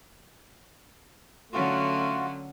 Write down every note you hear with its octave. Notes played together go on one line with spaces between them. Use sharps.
D3 F#3 A3 C#4 F4 F#4